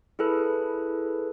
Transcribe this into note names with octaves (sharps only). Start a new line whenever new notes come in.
E4 G#4 A4 B4